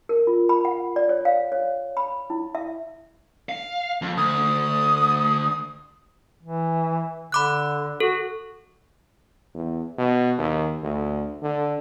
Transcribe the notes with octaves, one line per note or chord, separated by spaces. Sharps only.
A#4
F4
B5
F#5
D5
C#5
F5
C#5
B5
E4
E5
F5
F2
D2 D#6
E3
D3 B5 D6 F#6
F#4 A4
E2
B2
D#2
D2
D3